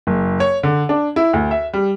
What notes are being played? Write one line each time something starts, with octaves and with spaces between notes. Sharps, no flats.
F#1
C#5
D3
D4
E4
D2
E5
G3